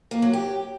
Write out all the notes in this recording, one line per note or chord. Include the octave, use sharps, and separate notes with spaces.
A#3
F#3
G4